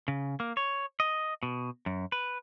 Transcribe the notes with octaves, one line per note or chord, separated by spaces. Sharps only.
C#3
A#3
C#5
D#5
B2
F#2
B4